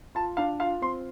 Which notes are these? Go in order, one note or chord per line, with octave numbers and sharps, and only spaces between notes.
F4 A5
D4 F5
F4 F5
C4 C6